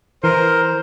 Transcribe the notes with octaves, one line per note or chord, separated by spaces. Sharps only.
E3 A#4 C5